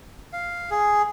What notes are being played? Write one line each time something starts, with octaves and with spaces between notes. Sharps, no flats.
F5
G#4